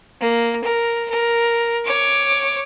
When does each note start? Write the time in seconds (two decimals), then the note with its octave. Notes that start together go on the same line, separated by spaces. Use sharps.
0.21 A#3
0.64 A#4
1.10 A#4
1.85 C#5 D6